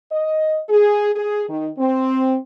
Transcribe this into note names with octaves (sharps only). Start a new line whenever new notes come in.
D#5
G#4
G#4
D#3
C4